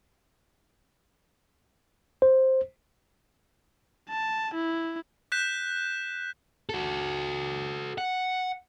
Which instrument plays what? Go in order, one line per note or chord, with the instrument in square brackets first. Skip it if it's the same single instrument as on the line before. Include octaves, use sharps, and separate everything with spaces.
[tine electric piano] C5
[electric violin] A5
E4
[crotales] F#6 G6 B6 E7
[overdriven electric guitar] F#4 A4
F#5